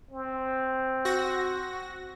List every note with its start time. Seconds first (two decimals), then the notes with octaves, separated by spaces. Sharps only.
0.11 C4
1.05 F#4 A#6